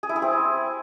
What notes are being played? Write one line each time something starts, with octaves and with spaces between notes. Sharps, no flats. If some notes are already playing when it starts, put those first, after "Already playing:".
G#4
E4
G#4
C4